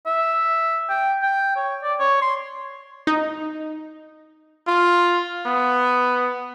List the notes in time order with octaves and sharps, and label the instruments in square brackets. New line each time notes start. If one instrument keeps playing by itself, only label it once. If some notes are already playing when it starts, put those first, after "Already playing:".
[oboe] E5
G5
G5
C#5
D5
C#5
C6
[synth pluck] D#4
[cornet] F4
B3